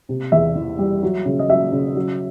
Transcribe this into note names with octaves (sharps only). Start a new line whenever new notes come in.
C3
E2 E5
E3
G3
F#3
C#3
D#5
F#3 E5
C#3
F#3